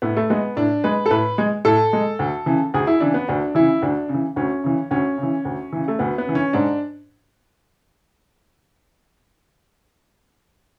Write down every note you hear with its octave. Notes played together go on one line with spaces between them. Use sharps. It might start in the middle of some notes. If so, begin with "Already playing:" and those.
A2 B3
A3
G#3 B3
A2 D4
G#3 B4
A4
A2 B4
G#3
A2 A4
G#3
D2
C#3 E3
D2 G#4
E4
C#3 E3 D4
B3
D2 D4
C#3 E3 E4
D2 D4
C#3
E3
D2 C#4
C#3 E3
D2 C#4
C#3
E3
D2
C#3 E3
A3
D2 B3
B3
C#3 E3
C#4
G#2 D4